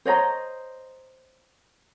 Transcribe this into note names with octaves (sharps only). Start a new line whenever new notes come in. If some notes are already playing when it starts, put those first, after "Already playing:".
C5 C#5 D#5 A#5